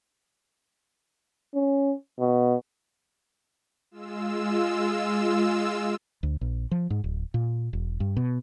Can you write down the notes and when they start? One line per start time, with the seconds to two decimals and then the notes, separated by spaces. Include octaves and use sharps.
1.54 C#4
2.20 B2
3.91 G#3 F4 E6
6.23 D2
6.41 A#1
6.71 F3
6.90 G#2
7.04 D1
7.34 A#2
7.73 E1
8.00 G2
8.17 B2